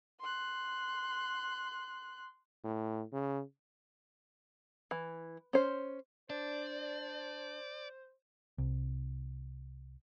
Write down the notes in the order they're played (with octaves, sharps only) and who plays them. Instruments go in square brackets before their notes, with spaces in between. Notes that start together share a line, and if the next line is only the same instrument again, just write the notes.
[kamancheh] C6 F#6
[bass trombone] A2
C#3
[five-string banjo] E3
C#4 C5
[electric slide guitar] D4 [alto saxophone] C5 [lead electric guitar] D5
[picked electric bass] C2